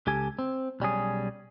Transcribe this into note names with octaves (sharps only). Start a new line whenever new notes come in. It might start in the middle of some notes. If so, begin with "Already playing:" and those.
C#2 C#3 G4 A4 G#5
C4
B1 G3 C#4 G#4